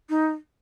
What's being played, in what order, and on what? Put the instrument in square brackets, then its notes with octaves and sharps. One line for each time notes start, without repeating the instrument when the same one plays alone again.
[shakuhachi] D#4